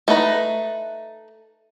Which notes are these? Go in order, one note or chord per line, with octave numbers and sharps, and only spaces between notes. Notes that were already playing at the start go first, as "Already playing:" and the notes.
A3 D#4 B4 A#5